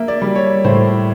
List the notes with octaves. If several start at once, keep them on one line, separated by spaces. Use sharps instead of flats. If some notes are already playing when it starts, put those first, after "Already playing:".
Already playing: A#3 E5
D5
G3
C#5
A2 C5